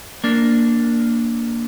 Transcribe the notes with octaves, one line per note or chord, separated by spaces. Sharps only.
A#3 D4